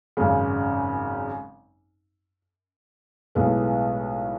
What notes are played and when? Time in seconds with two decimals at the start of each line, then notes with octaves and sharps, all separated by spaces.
0.17 G#1 F#2 C#3
3.35 B1 A2 G#3 B3